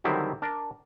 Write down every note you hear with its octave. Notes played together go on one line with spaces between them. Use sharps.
D3 D#3 F#3 G3 C4 E4
D4 A#4 D5